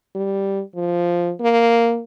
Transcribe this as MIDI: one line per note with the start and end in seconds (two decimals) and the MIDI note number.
0.15 0.61 55
0.75 1.32 53
1.40 2.02 58